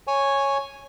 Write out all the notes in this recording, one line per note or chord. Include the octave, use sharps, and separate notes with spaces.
C#5 G#5